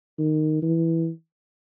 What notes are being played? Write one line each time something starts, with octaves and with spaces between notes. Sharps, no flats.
D#3
E3